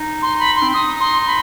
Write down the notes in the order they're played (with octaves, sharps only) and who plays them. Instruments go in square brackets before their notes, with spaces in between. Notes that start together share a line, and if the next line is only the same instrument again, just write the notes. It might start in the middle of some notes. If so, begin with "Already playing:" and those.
Already playing: [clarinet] D#4
[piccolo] C6
B5
C6
[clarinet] C4
[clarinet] D#4 [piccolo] D#6
[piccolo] C6
B5